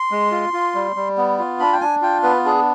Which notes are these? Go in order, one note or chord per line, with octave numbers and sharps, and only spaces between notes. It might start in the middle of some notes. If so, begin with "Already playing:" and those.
Already playing: C6
G#3
F4
F4
G3
G3
B3
F4
D4 B5
G5
D4 G#5
F4 G5
B3 B4
D4 G#4